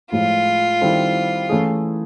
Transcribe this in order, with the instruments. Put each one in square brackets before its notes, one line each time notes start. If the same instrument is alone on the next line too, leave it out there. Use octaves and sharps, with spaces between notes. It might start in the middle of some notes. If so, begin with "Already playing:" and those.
[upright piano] A2 F3 G#3 [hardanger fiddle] F4
[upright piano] D#3 G3 C4 E4 A4
E3 A3 C#4 E4 G#4